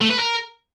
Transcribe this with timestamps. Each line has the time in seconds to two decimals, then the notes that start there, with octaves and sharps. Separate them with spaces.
0.01 A3
0.10 B4
0.20 A#4